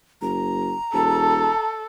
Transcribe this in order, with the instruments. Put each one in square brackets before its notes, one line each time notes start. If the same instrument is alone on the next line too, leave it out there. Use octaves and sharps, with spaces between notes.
[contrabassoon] F#1 [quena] A#5
[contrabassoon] E1 [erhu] A4 [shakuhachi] A5